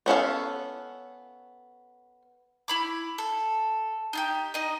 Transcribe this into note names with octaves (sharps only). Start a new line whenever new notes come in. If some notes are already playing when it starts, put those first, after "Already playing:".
B3 C#4 A4 F5
E4 B5 D6
A4
D#4 F4 G4
D#4 D#5